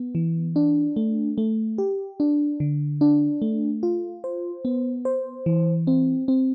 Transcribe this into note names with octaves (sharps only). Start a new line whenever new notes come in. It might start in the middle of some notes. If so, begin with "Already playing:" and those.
Already playing: B3
E3
D4
A3
A3
G4
D4
D3
D4
A3
F4
C5
B3
C5
E3
C4
C4